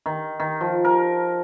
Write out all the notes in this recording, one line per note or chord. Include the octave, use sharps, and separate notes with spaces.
D#3
D#3
F3
A#4